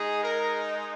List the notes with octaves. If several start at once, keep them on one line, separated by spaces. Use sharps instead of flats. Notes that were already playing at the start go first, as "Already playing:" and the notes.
Already playing: G#3 D#4 G#4
A#4